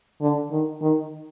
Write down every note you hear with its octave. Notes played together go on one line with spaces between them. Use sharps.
D3
D#3
D#3